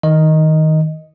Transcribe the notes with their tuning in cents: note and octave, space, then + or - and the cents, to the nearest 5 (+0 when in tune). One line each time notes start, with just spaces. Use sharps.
D#3 +15 D#5 +0